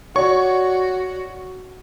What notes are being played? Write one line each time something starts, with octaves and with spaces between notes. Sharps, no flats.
F#4 C#5 D5 C#6